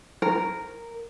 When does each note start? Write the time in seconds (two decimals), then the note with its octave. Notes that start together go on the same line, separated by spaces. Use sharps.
0.22 A#4